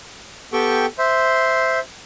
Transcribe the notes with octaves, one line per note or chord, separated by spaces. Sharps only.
B3 G4 A4 G5 C#6
C5 E5 C6